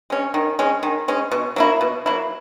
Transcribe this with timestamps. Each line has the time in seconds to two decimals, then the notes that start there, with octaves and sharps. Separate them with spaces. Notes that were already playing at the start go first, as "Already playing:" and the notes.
0.10 G#3 C#4
0.34 D#3
0.59 G#3 C#4
0.83 D#3
1.08 G#3 C#4
1.31 B2
1.56 F#3 A#3 E4
1.81 B2
2.06 F#3 A#3 E4